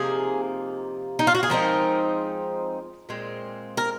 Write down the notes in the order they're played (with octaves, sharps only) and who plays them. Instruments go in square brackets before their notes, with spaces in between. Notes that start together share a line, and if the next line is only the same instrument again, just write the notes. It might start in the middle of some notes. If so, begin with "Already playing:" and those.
Already playing: [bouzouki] C3 F3 A#3 D#4 G#4
D#4
F4
F#4
G#4
F3 G#3 C4 D#4 A#4
A#2 G#3 C4
A#4